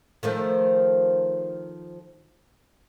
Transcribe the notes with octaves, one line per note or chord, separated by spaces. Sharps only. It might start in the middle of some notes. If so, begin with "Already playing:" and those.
D#3 F3 A3